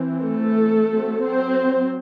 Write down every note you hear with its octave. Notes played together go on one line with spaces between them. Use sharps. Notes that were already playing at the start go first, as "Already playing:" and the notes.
Already playing: E3 C4
A3 A4
F#3 C4
C4 C5